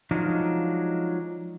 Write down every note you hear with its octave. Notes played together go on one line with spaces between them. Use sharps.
F3 F#3 G#3 D4 D#4 F4